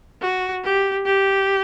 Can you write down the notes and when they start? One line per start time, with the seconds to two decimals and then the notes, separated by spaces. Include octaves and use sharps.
0.22 F#4
0.64 G4
1.06 G4